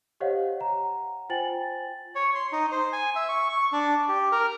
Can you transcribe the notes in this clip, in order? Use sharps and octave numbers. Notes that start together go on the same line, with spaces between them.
G4 C5 C#5 D#5 F5 F#5
F#5 A#5
F4 C5 G5 G#5 A6 F#7
C#5
C6
D#4
C5
G#5
E5
C#6
C#6
D4
G4
A#4